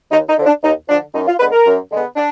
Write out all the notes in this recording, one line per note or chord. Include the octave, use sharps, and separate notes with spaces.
D#2 D#4
D#4
D3 F3
D4
D#2 D#4
D3 F3 D4
F#2 D#4
F4
D3 G#3 B3 B4
A#4
F#2
D3 G#3 B3
D4